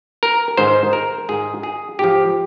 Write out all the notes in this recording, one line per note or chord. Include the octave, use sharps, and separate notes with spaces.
A#4
G#2 D#3 C5
A#4
G#2 D#3 G#4
G#4
G#2 F3 G4